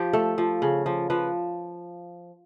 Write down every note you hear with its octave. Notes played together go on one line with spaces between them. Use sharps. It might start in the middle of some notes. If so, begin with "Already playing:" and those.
Already playing: F3 G4
A3 A4
F3
C#3
F3
F3 B4